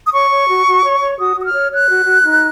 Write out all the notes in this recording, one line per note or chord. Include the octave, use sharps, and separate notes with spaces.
D#6
C#5 C#6
C#5
F#4
F#4
C#5
C#5
F#4 D#6
F#4 D#6
F6
C#5
C#5 F#6
F#4
F#4
D#4